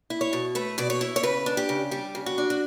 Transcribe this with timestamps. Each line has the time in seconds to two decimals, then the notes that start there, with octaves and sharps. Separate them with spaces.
0.10 E4
0.21 C#5
0.33 B2
0.55 A3 B4
0.78 B2 D5
0.90 C#5
1.01 E4
1.16 C#5
1.23 C#3 B4
1.46 D4
1.57 G4
1.69 C#3
1.91 G3 G4
2.15 C#3
2.26 F#4
2.38 D4
2.50 F#4